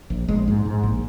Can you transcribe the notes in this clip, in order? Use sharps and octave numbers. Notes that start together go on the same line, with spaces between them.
A#1
A#1 G#3
G#2
G#2
A#1